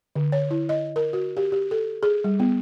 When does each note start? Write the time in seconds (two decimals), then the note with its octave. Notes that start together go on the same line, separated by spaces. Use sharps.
0.16 D3
0.32 C#5
0.51 E4
0.69 D#5
0.96 A#4
1.13 F#4
1.37 G4
1.52 G4
1.71 A4
2.03 G#4
2.24 G3
2.40 B3